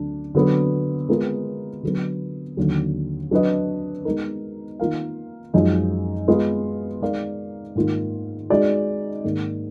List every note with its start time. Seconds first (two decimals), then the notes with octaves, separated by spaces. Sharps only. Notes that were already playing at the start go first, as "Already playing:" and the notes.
Already playing: D2 D3 F#3 D4
0.35 D3 F#3 B3
1.09 G#3 B3 F4 A#4
1.83 D3 F#3 B3
2.57 D#2 D3 F#3
3.31 F#3 D4 F#4 B4 D#5
4.05 G#3 B3 D#4 A#4
4.80 D#3 A#3 F4 A#4 F5
5.54 F#2 F3 G#3 D#4
6.28 G#3 B3 F4 B4 D#5
7.02 G#3 D#4 A#4 D5 F5
7.75 G#2 D#3 A#3 F4
8.50 G#3 D#4 F#4 D5
9.24 G#2 D#3 A#3